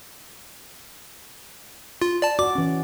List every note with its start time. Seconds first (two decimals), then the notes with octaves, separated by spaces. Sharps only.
2.02 F4
2.22 D5 A5
2.39 F#4 D5 D6
2.55 E3 C#4